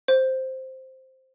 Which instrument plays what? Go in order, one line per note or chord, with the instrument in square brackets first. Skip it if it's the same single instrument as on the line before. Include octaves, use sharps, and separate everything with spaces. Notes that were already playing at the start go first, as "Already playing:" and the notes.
[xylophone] C5